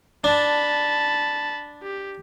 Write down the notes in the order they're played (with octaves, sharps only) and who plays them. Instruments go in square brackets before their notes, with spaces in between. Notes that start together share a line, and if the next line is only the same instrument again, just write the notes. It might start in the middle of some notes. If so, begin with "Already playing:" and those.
[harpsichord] D4 [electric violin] A5 B5
[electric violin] G4